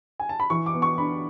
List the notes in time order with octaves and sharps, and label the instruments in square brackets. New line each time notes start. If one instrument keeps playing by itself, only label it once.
[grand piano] G#5
A5
B5
E3 C#6
D6
B3
C#6
D4 B5